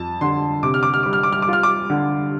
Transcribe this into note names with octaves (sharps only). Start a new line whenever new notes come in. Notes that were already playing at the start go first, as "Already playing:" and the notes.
Already playing: F2 A5
D3 C6
C3 D6
F6
D6
F6
G3 D6
F6
D6
F6
D6
F4 F6
D6
D3